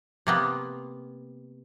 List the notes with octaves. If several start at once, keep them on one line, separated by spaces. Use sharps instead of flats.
C3 A#3 B3